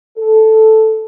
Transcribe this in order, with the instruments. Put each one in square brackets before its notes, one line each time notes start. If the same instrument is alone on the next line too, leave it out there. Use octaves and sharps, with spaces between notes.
[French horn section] A4